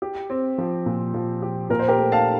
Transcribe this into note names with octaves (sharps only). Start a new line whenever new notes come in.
G4
C4
F3
A#2
F3
G4
A#2 A#4
C5
G4 A#4
A3
F5 A5